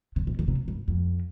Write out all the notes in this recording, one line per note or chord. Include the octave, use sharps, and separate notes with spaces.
C3
B2
D3
C3
G2
F2